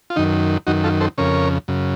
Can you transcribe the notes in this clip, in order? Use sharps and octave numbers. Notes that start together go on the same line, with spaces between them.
F4
F#2 D#3 D#4
F#2 D#3 D#4 F#4
F4 A4
A4 C5
F2 C#3 A#4 C#5
F#2 C#3